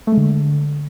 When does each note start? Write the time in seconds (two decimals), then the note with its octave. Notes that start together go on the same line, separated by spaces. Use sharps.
0.07 A3
0.12 G#3
0.17 D3